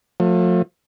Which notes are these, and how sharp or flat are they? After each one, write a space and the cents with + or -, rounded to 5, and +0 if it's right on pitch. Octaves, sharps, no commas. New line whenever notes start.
F3 +40 A3 +30